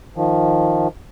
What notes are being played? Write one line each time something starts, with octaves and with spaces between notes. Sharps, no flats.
D#3 F3